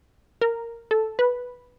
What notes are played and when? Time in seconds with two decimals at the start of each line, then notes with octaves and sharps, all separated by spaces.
0.41 A#4
0.91 A4
1.19 B4